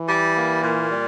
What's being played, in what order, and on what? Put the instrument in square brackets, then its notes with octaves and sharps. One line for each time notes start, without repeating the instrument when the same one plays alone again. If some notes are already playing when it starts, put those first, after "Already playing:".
Already playing: [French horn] E3
[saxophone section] G3
A#3
A#2
G3